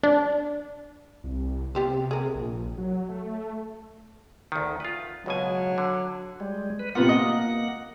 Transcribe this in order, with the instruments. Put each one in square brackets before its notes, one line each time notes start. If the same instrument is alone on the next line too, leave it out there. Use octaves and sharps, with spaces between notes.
[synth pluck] D4
[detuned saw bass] C2
[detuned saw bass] C3 [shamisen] B3 G4 C5
[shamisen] G#4 A#4
[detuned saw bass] A#1
F#3
A3
[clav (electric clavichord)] D2 D#3
F4 B4
[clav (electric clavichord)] C#2 B2 G#5 [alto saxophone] F#3
[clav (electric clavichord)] D3
[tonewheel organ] G3 G#3
B4
[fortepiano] C3 B3 F4 [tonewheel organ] A#3 F#5
[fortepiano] D#5